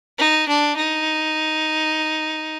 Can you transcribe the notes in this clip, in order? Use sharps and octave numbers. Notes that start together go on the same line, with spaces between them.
D#4
D4
D#4